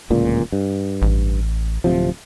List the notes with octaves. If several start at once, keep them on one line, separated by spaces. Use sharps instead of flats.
D1 C#2 A#2
G2
A1
D1 C3 F3